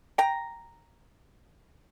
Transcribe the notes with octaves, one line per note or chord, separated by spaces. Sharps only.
G5 A#5